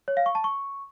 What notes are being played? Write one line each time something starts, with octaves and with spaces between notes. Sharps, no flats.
C#5
F5
C#6
A5
C#6